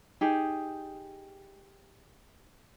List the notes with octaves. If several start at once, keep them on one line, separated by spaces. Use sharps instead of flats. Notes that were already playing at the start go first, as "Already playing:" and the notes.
D#4 G4 G#4